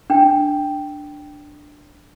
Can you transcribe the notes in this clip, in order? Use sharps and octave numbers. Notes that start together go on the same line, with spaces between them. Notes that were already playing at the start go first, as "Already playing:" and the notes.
D4 G5